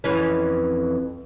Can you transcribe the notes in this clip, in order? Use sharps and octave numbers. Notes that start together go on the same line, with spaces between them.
F2 E3 C#4